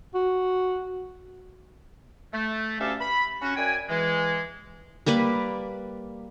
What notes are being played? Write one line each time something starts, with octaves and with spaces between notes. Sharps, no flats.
F#4
A3
D2 C#4 G4 A4 E5 F5
B5
C#4 F#4
F#2 D5 G5 G#5
E3 G#3
G3 A#3 B4 D5